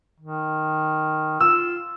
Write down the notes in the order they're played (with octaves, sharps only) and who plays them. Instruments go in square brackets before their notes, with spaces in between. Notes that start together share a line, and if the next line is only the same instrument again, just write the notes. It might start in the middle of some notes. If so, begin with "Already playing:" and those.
[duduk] D#3
[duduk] F4 [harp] E6